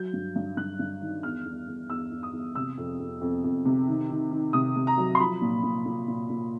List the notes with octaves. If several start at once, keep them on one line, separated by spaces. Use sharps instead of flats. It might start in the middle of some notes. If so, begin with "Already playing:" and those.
Already playing: F#3 G6
G2
G2
G2 F#6
G2
D#3
E2 F6
E2
E2
E2 E6
E2
D#6
E2
C3 E6
F2
F2
F2
F2
C3
D#3
D#3
D#3
C3 D#6
C3
A#5
F#3
C6
F3 B5
A#2
A#2
A#2
A#2
A#2